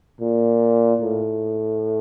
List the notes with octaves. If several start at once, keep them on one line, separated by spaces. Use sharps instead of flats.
A#2
A2